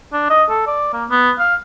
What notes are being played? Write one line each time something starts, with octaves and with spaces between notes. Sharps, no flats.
D4
D#5
A4
D5
A#3
B3
F5